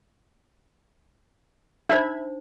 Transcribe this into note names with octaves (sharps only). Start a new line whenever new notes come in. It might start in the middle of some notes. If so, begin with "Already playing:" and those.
D4 D#4 C5 E5 B5 G#6